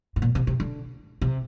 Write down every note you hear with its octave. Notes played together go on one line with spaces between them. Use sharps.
A2
A#2
C3
C3
D3
C3